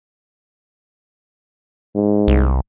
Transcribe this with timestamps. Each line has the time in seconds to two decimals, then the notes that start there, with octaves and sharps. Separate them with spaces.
1.95 G#2
2.28 C2